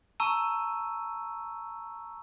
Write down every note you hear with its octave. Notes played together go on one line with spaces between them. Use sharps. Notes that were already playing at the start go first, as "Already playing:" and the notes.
A5 A#5 C#6 E6 D#7